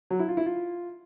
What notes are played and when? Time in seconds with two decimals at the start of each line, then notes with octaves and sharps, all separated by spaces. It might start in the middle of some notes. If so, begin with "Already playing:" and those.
0.11 F#3
0.19 E4
0.28 F4
0.37 E4
0.46 F4